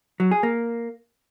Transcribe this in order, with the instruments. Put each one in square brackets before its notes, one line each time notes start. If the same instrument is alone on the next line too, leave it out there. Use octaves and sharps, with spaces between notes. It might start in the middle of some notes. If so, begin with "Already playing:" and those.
[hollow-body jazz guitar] F#3
G#4
A#3